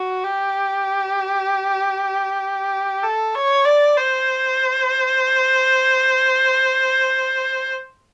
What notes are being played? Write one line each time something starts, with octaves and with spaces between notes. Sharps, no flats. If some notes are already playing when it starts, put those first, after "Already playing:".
Already playing: F#4
G4
A4
C#5
D5
C5